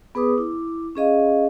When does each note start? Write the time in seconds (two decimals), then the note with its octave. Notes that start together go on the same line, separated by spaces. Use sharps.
0.15 B3 G#4 B4 D6 D#6
0.37 E4 D6
0.95 C#4 G#4 D#5 F5